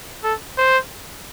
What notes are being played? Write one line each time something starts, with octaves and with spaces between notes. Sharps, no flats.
A4
C5